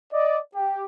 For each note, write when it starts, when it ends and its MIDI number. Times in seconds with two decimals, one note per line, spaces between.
0.13 0.39 74
0.13 0.39 75
0.55 0.85 67